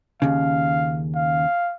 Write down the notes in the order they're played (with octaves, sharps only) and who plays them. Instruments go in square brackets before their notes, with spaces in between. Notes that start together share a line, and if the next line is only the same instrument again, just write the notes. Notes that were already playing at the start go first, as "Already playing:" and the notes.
[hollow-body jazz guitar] D#2 C#3 [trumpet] F5
[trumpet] F5